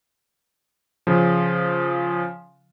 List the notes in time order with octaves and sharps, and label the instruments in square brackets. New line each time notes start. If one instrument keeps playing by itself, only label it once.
[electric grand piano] C#3 F3